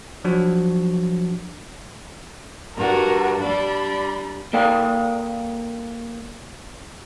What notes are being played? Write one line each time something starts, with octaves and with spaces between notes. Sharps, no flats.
F3 F#3 D4 F#4 C#5
G2 F#4 A#4
G3 D4 B5
A#3 A4 D5 F5 G5